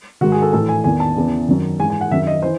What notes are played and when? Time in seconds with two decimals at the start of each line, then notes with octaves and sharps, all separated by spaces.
0.21 G#2 D#3 F#4
0.32 G#4
0.42 A4
0.53 A2 E3 A4
0.69 G#5
0.84 E2 D#3 G#5
1.00 A5
1.16 E2 C#3 E3
1.48 F#2 D#3
1.80 G#2 E3 G#5
1.90 G#5
2.01 F#5
2.11 F#2 D#3 E5
2.22 E5
2.27 D#5
2.42 E3 C5